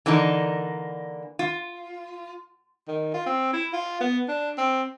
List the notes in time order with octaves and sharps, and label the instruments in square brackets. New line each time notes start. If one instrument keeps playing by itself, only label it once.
[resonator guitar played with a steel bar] D3 E3 A#3 D4 D#4
F4
[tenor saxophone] D#3
F4
C4
E4
F4
B3
D4
C4